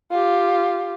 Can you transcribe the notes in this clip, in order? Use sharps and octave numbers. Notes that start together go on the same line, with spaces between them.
F4 G4